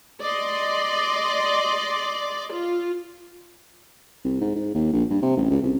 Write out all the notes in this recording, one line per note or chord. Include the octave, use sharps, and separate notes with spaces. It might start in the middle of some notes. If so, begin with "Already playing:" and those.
D5 D#5 C6
F4
C2
G#2
G#2
D#2
A#1
G2
C3
A1
C#2
C2